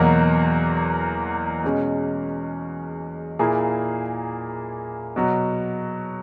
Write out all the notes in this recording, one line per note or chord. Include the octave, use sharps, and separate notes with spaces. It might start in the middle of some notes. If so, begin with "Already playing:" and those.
Already playing: E2 B2 F#3 A#3
B2 G#3 C#4
A#2 A#3 E4 G#4
B2 F#3